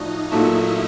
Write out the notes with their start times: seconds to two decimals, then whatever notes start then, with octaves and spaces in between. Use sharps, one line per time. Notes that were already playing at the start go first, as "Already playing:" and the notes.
Already playing: A2 F3 D4 D#4 F#4 D#5
0.31 A#2 F#3 A3 E4 E5